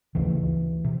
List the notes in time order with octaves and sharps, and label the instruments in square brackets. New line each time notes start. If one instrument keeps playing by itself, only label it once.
[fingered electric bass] D2 C#3 E3
C3